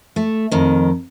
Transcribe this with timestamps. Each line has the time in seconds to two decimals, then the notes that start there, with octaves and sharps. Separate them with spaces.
0.16 A3
0.51 F2 D#3